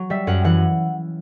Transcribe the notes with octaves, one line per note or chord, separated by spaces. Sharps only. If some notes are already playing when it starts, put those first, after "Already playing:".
Already playing: F#3
G3 E5
F#2 F#5
E3 F#5